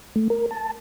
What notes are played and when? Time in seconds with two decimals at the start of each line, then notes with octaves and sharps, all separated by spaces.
0.16 A3
0.30 A#4
0.51 A5